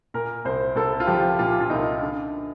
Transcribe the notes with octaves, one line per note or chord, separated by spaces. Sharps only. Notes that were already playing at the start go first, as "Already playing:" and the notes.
A#2 A#4
C2 C5
C2 A4
F4
F3 G4
A#2 F4
F4
C2 D#4
D3